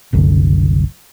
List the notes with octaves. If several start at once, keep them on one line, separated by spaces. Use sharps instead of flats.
F#1 C2 F#2 D3